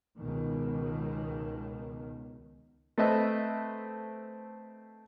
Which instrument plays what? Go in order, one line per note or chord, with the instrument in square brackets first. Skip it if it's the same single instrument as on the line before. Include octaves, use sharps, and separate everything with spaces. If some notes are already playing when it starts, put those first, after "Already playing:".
[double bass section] C#2 B2 D#3
[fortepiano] A3 C4 B4 D#5 E5 A5